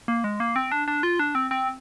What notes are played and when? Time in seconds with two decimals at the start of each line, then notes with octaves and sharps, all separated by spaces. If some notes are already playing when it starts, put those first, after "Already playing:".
0.08 A#3
0.24 G#3
0.40 A#3
0.56 C4
0.72 D4
0.88 D4
1.03 F4
1.19 D4
1.35 C4
1.51 C4